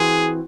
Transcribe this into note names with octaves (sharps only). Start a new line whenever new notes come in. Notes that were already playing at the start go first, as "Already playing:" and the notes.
Already playing: E3 C4 F#4 G#4